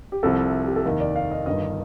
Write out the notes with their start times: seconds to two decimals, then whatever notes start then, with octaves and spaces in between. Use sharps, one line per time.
0.12 G4
0.23 C2 C3 F3 A4
0.66 G4
0.76 A4
0.85 F1 D#2 D#3 A#4
1.00 D5
1.16 F5
1.31 D#5
1.46 G1 G2 D#3 D#5